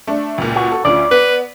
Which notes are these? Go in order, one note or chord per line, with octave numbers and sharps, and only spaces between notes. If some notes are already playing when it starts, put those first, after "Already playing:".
A3 D4
C#2 A#2
F#4
A4
D2 C#4 F4 D5
B3 B4